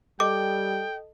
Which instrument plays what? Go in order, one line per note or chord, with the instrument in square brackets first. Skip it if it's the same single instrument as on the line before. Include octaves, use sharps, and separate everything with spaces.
[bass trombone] G3 [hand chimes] A4 D#5 [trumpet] G5 [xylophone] D6